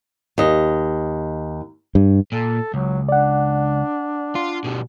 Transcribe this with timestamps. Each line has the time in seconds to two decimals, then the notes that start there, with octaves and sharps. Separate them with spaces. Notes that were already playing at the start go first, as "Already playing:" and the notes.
0.38 D#2 D#5
1.95 G2
2.32 A#2 A4
2.74 C#2 F#3
3.09 D4 D5 F#5
4.35 F4
4.65 B2 G3